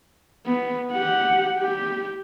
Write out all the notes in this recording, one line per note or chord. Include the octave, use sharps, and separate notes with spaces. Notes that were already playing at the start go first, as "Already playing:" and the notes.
B3
G4 F#5
G4